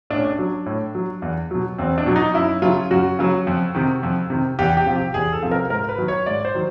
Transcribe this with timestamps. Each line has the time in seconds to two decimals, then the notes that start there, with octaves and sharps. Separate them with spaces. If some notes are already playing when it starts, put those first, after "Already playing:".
0.10 A2 D4
0.17 C#4
0.24 D4
0.39 F#3
0.66 A2
0.95 F#3
1.22 E2
1.51 B2 F#3
1.78 E2 C4
1.98 D4
2.06 B2 F#3
2.16 D#4
2.34 F#2 E4
2.62 C#3 F#3 F4
2.91 F#2 F#4
3.19 C#3 F#3
3.47 F2
3.75 C3 D#3
4.03 F2
4.30 C3 D#3
4.59 E2 G4
4.77 G4
4.86 C3 F3
4.96 G4
5.14 E2 G#4
5.33 A4
5.42 C3 F3
5.51 A#4
5.70 G#2 A#4
5.89 B4
5.98 D#3 F#3
6.08 C#5
6.26 G#2 D5
6.45 C5
6.55 D#3 F#3